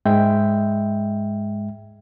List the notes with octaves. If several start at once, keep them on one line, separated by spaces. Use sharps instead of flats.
G#2 G#3 E5 G5